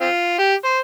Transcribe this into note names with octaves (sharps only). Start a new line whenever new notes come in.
C4 F4
G4
C5